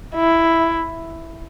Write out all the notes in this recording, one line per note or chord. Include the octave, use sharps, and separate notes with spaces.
E4